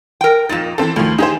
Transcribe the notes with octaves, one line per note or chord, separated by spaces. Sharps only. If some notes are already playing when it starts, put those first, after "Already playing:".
A#4 G5
F2 A#2 D#4 A6 E7
D#3 E3 C4 A4
D2 D#3 F3
D#4 G4 G#4 C5